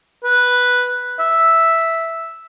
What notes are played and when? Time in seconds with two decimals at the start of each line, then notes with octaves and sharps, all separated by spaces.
0.24 B4
1.19 E5